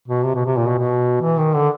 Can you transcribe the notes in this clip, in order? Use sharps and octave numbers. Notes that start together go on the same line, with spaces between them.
B2
C3
B2
C3
A#2
B2
B2
E3
D#3
D3